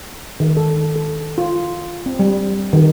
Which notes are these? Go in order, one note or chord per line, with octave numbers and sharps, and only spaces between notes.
D#3
A4
A4
F4
C4
G3
D#3